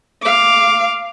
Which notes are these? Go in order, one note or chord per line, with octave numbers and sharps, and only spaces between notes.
F5 D6